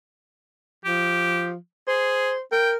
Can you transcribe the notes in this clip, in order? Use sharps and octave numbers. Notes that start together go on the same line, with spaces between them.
F3 G4
G#4 C5
A#4 G5